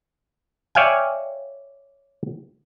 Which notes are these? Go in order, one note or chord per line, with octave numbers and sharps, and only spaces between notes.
C#5 D5 E5 F5 G5 G#5